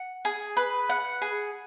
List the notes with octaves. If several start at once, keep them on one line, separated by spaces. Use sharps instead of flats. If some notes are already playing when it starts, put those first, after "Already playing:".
Already playing: F#5
G#4
B4
F#5
G#4